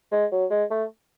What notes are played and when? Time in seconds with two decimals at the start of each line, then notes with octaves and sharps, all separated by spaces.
0.12 G#3
0.32 F#3
0.50 G#3
0.70 A3